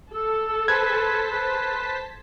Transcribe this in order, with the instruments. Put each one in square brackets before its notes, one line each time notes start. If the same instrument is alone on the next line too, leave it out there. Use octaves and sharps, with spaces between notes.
[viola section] A4 [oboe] E6
[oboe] B4 [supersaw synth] C5 A5 B6 [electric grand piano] G#6
[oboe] B4